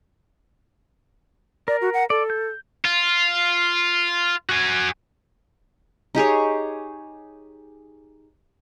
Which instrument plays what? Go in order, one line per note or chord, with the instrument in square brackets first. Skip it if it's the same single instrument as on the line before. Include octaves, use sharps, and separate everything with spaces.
[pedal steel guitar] A#4 [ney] D5
[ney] F#4
F#5
[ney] A4 [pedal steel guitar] D5
[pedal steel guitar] G6
[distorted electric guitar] F4
F#4 G#5
[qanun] D#4 G4 G#4 C#5